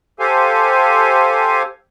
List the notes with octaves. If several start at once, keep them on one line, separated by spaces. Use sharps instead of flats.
G4 A4 C5 F5 G#5